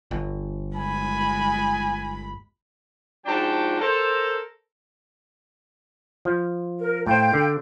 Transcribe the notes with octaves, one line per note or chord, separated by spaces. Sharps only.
G1
G#3 G#5 B5
G#2 F3 D4 F#4 G5 A5
A4 A#4 C5
F3
A#4
A2 C5 F5 G5 G6
D3